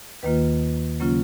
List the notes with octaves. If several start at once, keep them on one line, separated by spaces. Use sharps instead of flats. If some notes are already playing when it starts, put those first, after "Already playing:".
D#2 D#3 A#3 F4 B4
C#3 F#3 A#3 C#4 F4